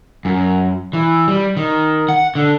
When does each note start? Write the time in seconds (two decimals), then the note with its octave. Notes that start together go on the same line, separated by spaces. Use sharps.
0.25 F#2
0.93 E3
1.28 G3
1.57 D#3
2.09 F#5
2.35 D3